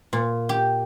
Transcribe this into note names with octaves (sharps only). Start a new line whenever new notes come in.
A#2
G4